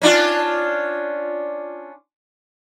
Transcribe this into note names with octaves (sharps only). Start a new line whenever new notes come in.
C#4 D4 F4